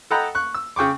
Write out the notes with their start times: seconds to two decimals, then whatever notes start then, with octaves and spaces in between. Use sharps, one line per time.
0.11 A4 D#5 F#5 G5 A#5 B5
0.35 C#6 F#6
0.55 E6
0.76 C#3 G5 C#6 D6